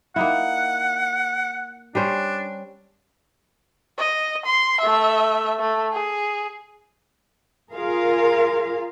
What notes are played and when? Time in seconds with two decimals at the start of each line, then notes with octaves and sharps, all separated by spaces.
0.16 A#3 D#4 E4 F#5
1.95 G3 C#4 D4 C5
3.99 D#5
4.46 C6
4.81 A3 E5
5.59 A3
5.93 G#4
7.72 F4 G#4 A#4 F5